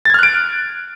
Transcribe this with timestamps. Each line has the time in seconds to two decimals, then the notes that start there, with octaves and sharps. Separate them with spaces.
0.05 A6
0.10 G#6
0.14 F6
0.19 F#6
0.23 D7